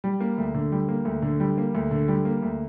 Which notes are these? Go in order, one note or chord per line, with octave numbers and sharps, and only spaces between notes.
G3
A#3
D2
D3
G3
A#3
D2
D3
G3
A#3
D2
D3
G3
A#3
D2